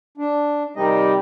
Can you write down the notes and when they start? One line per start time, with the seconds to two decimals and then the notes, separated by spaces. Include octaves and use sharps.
0.18 D4
0.76 C3 D#3 G3 D#4 D#5